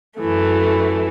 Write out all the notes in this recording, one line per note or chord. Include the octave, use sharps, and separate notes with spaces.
F#2 E3 A3